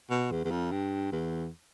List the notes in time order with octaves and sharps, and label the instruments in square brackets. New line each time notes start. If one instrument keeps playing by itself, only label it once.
[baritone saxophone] B2
E2
E2
F2
G2
E2